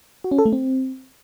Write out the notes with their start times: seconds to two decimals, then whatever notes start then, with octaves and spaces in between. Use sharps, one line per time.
0.24 F#4
0.31 C#4
0.39 A4
0.46 A3
0.53 C4